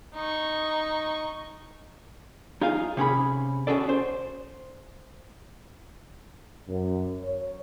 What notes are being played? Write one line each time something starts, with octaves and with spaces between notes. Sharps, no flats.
D#4 C#6
D#4 F4 G#4 F5
C3 C#4 G#4 B5
C#4 D4 F#4 G#4 A4 D5
C5
F#2
C#5